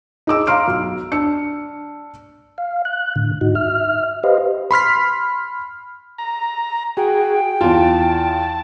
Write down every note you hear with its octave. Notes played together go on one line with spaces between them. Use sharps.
D#4 G#4 D6 E6
F5 A#5 C6 F6 D7
B1
D4 E6 C#7
F5
F#6
A2 D3
G#2 D#4 F#4
E5 F6
G4 B4 C5 D#5 F5
B5 C6 F6 B6
A#5
F#4 G#4 G5
E2 F4 A5